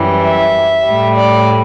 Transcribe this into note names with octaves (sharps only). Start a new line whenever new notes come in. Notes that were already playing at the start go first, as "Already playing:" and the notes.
Already playing: F#2 E3 G3
E5
A2 G3
D5